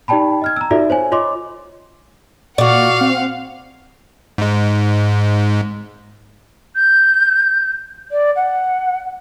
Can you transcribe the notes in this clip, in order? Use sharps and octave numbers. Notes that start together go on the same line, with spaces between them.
D#4 G4 D5 G5 A5 B5
D#5 F6 G#6
A#5 E6
D#4 F4 F#4 A4 D5 E5
C5 C#5 G#5
F4 C#5 D#5 C6 D6
A#2 F#4 D5 F5 F#5
C4
G#2 G#3
G6
D5
F#5